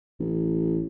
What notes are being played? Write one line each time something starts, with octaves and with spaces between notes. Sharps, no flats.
A1